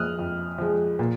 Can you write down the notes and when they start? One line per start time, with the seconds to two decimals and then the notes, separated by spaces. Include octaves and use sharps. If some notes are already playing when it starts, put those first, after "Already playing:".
Already playing: F2 F3 G#3 D#6 F6 F#6
0.19 F2
0.58 F3 G#3
0.99 A#2